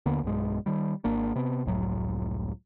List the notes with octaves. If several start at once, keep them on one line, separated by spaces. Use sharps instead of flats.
D#2 D3 A#3 B3
B1 G2 G#3
D#3 G3
G#1 A#3 D4
C3 B3
F1 C#2 A2 F#3